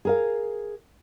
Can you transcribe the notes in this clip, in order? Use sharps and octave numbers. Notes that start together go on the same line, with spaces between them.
G#4 A#4 F5